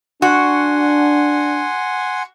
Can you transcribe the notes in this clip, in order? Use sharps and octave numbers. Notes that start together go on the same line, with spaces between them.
D4 F#4 F#5 G#5 C6